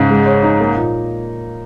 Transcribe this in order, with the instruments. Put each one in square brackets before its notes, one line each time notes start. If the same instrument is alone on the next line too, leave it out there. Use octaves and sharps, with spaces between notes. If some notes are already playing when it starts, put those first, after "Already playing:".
Already playing: [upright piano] G#2 C#3
[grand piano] G#3
C#5
D#4
A#3
A#2